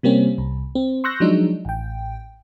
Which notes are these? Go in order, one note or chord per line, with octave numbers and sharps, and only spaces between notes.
C3 G3 A#3 C4 C#4
C2
C4
C6 C#6 E6 F#6 G6 A#6
F3 F#3 G#3 D4 D#4
A1 G5